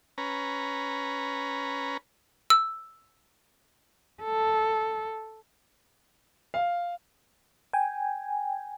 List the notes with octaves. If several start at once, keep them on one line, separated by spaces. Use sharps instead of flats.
C#4 B4 A#5
E6
A4
F5
G5 G#5